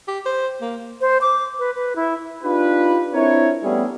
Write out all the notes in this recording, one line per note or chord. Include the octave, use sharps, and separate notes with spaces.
G4
C5
A#3
C5
D6
B4
B4
E4
D4 D#4 F4 G4 B4
C4 D4 E4 A#4 C#5
G3 A3 B3 C#4 E4 G#4